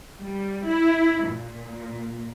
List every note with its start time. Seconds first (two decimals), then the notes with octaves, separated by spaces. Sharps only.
0.20 G3
0.67 E4
1.28 A#2